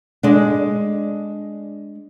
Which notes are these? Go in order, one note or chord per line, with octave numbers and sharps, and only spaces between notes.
G#3 D4